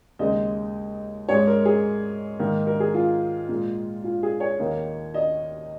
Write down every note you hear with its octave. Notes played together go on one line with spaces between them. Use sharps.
D#2 C#3 G#3 D#5
G#2 G#3 C#5
A#4
G#4
G#2 D#3 A#3 A#4
A#4
G#4
F4
A#2 G#3
F4
G#4
C#5
D#2 D#3 A#3
D#5